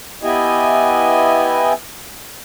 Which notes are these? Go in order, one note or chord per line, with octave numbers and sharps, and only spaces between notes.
B3 E4 G4 D#5 G#5